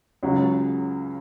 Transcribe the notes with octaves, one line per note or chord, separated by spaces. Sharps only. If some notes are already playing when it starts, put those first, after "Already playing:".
C#2 C#3 F#3 C#4